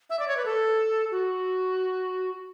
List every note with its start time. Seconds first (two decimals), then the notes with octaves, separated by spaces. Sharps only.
0.10 E5
0.19 D5
0.28 C#5
0.37 B4
0.46 A4
1.11 F#4